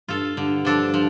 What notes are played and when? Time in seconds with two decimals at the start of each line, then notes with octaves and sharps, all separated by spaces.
0.09 G2 F4 A4
0.36 G2 D3
0.65 F3 D4 A4
0.94 F3